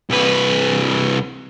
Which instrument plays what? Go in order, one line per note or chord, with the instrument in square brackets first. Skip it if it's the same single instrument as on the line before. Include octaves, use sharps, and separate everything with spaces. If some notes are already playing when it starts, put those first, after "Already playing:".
[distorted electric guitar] C2 B4